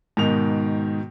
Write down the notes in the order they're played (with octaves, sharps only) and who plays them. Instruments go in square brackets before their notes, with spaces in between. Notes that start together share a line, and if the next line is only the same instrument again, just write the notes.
[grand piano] G#2 B2 D#3 F7